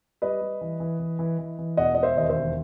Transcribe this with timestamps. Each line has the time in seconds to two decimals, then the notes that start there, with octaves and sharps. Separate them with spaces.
0.22 G3 B4 D#5
0.41 G3
0.61 E3
0.80 E3
0.99 E3
1.19 E3
1.39 E3
1.59 E3
1.77 E1 D#5 F#5
1.95 E1 D#5
2.03 C5 E5
2.17 D#2 D#5
2.29 C5 E5
2.36 E1